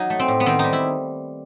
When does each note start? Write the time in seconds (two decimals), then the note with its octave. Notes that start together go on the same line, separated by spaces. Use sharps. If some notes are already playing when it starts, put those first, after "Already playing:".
Already playing: F#3 D#4
0.10 A3
0.19 C4
0.28 A2
0.40 B3
0.46 D#3 C4
0.59 G3 D#4
0.73 E4